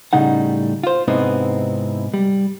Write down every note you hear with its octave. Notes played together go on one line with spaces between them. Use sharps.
A2 C#3 G3 D#4 F#5
F4 C5
G#2 C3 B3 C4 D#4 E4
G3